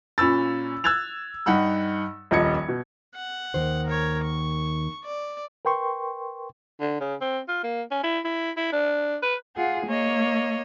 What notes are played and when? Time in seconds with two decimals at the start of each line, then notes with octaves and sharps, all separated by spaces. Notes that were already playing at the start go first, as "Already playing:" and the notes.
0.18 A#2 C#4 B5 E6 A6
0.84 E6 F#6 G#6 A6 F7
1.46 G2 D#4 F#5 B5 E6
2.31 D#1 A#1 F2 D#5 G#6 C#7
2.68 B2
3.15 F#5
3.54 D#2 D#3 C5
3.87 A#4 C#5
4.24 C#6
5.05 D5
5.65 A#4 B4 G5 C6 C#6
6.80 D3
7.00 C#3
7.21 C4
7.48 F4
7.63 A#3
7.91 C#4
8.03 E4
8.24 E4
8.57 E4
8.72 D4
9.22 B4
9.55 F4 G#4 F#5
9.85 A#3 C#5 D#5